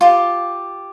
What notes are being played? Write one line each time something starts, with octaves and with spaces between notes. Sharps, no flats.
F4 G4